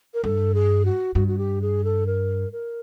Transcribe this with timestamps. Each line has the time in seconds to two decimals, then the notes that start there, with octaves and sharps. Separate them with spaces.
0.14 A#4
0.24 G2 A4
0.54 G#4
0.85 F#4
1.15 G2 F#4
1.28 F#4
1.38 G4
1.62 G#4
1.84 A4
2.07 A#4
2.52 A#4